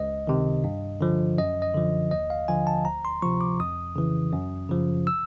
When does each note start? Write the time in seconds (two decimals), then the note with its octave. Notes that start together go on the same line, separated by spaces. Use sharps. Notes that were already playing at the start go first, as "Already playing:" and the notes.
Already playing: C#2 D#5
0.27 C3 D#3
0.64 G2
1.01 D3 F3
1.38 F#2 D#5
1.62 D#5
1.74 D3 F3
2.11 D#2 D#5
2.30 F5
2.48 D3 F3 G#5
2.67 A5
2.85 D2 A#5
3.05 C6
3.22 C3 F3 C#6
3.41 D6
3.60 F2 D#6
3.96 C#3 E3
4.33 F#2
4.70 C#3 F3
5.07 E6